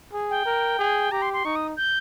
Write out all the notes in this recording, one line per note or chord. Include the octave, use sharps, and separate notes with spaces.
G#4
G5
A#4
G#4
G4 A#5
C6
C6
D#4 C#6
D#6
G6